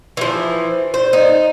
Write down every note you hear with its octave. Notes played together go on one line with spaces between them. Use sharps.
E3 F3
C5
D#4